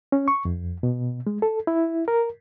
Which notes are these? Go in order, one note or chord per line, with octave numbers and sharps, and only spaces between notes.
C#4
C#6
F2
B2
G#3
A4
E4
A#4